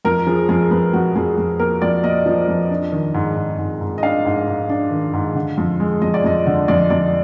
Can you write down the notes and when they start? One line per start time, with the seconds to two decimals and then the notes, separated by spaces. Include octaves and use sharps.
0.05 F2 A#4
0.27 F3 G#4
0.49 F2 G#4
0.71 F2 B4
0.94 F2 F#4
1.15 F2 G#4
1.37 F2
1.59 A#3 A#4
1.82 F2 D5
2.04 A#3 D#5
2.26 F3
2.48 F2
2.70 D4
2.92 D#3
3.14 G#2
3.37 G#2
3.58 G#2
3.81 G#2
3.98 D#5
4.03 D4 F5
4.25 G#2
4.47 G#2
4.69 D4
4.91 D#3
5.13 G#2
5.35 D3
5.58 F2
5.80 G#3
6.02 F2 D#5
6.14 D5
6.24 F2 D#5
6.47 D3
6.68 F2 D5
6.90 F2 D5